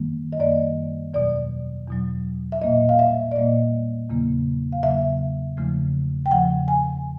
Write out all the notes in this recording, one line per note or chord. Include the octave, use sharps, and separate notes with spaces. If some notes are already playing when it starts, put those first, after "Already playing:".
Already playing: F#2 D#3 G3 A#3
D#5
F#2 D#3 G3 A#3 D5
E2 B2 F#3 D5
E2 B2 F#3
E5
A#2 G3 A#3 D#5
F5
E5
D5
A#2 G3 A#3 D#5
E2 C#3 F#3 A#3
F5
E2 C#3 F#3 A#3 E5
E2 C#3 F3 A3
G5
E2 C#3 F3 A3 F#5
G#5